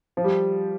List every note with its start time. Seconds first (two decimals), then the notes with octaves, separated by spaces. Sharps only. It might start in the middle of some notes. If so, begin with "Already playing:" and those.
0.17 F3
0.24 G3